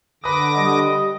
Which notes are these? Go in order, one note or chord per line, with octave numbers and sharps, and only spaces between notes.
D3 B4 D6 D#6 A#6
G3 D#5